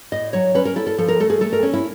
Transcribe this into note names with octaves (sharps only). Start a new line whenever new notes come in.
A2 D#5
F#3 C#5
C#4 B4
A#4
E4 A4
A4
F3 A4
A#4
A3 A4
G#4
A3 A4
A#4
C#4
E4